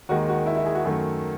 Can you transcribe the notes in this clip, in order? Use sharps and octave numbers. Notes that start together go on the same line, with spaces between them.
D#2 D#3 G#3 F#4
F#4
E4
E4
G#4
F#4
F#2 D#3 A3